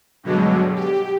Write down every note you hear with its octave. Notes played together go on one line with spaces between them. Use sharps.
G2 B2 D3 F#3 G#3
G4